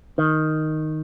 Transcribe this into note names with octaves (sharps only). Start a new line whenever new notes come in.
D#3